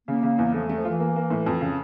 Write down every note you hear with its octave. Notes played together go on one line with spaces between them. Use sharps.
C#3 A#3
C#3
E2
F3 A3
A3
F3
E3 F4
A#3
A#3
A2
F2
C#3